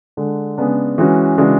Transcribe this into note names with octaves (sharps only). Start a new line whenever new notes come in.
D3 G#3 D4
C#3 G#3 B3 D4
E3 G#3 C#4 F#4
C#3 E3 G#3 D4 F#4